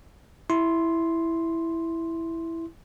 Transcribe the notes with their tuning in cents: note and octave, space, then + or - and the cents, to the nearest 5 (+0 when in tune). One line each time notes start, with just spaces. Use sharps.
E4 +0 C6 +0